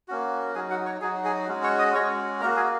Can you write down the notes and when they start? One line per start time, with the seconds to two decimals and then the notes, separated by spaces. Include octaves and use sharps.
0.08 A#3 C#4 F#4
0.55 F#3 D#4 F#4 G#4 G#5
0.70 F#4 F#5
0.86 C#5 C#6
1.01 F#3 D#4 F#4 G#4 G#5
1.25 G#4 G#5
1.48 G#3 C#4 F#4
1.63 C#5 C#6
1.79 D#5 D#6
1.95 G#3 C#4 F#4 C#5 C#6
2.41 A#3 A#4 A#5
2.45 F#4
2.56 G#4 G#5